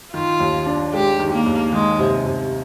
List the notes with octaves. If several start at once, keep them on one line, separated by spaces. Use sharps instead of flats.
D#3 F4
D#2
D4
G#3 G4
D#3
A#3
D#2
D#3 G#3
C3
C3